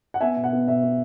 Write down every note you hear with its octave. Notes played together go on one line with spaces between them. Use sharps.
F#5
B3 E5 G#5
B2
F#5
B3
B2 E5
B3